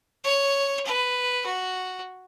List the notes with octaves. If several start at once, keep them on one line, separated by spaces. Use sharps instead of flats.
C#5
B4
F#4